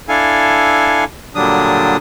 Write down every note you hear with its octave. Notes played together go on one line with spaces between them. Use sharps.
D4 E4 A4 F5 G#5
A#2 D3 F#3 G3 D4 D#6